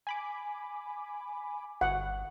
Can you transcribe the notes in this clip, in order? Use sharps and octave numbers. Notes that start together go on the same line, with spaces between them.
G#5 B5 D6
G1 F#5